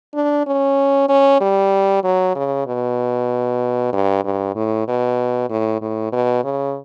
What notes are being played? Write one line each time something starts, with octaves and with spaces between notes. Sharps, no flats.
D4
C#4
C#4
G3
F#3
C#3
B2
G2
G2
A2
B2
A2
A2
B2
C#3